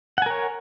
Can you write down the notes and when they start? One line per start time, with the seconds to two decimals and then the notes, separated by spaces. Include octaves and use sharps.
0.18 F#5
0.22 G#5
0.26 A#4
0.30 C#5